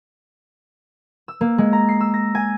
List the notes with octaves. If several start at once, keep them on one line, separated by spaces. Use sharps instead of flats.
E6
A#3
G#3
A#5
C7
E6
A#6
G#5